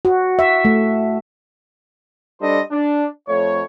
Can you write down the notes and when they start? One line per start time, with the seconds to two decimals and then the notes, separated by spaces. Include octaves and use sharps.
0.05 F#4
0.39 E5
0.65 A3
2.41 G3 D4 A4 C5 D#5
2.71 D4
3.28 F2 A3 C#5